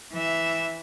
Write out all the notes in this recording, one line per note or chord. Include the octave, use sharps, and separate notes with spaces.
E3 E5